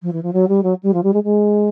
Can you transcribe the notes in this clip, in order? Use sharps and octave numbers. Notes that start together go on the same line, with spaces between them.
F3
E3
F3
F#3
G3
F#3
G3
F3
G3
G#3
G#3